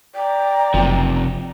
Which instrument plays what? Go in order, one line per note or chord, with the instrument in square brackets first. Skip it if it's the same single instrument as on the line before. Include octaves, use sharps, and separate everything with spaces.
[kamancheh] D5 A#5 [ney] G5
[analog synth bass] F#1 [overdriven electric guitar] C3 F3